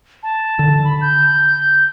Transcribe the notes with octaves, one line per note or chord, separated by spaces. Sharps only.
A5
D3
B5
G6